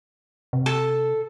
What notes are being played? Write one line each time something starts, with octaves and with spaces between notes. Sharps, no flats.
C3
A4